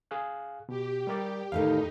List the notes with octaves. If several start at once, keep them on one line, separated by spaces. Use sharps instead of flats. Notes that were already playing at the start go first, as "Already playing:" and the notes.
G#4 F5 F#6
B2 G4
G3 A#4 D5
E2 A2 D#3 D#4 F5